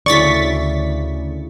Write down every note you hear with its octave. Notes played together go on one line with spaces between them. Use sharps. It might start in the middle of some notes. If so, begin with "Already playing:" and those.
D2 C#3 E4 D5 C#6 A6 B6